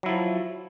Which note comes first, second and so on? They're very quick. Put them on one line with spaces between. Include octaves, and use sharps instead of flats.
F#3 E4 F3